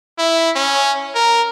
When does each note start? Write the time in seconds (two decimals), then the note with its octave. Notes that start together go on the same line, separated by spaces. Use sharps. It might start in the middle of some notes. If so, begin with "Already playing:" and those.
0.18 E4
0.56 C#4
1.15 A#4